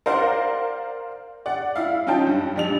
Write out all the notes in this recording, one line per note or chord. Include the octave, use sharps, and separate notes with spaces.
A#4 C5 D5 F5 F#5
D5 F#5
E4 F5
C#4 D#4 F4 G5 A5
G2
A#1 G3 F7